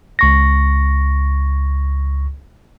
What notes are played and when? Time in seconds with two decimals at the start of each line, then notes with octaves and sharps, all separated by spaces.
0.19 C#2 C#6 A#6